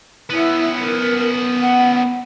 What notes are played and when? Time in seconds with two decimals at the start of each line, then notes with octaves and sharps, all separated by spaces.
0.30 B3 C#4 E4
0.79 A#4
1.59 F#5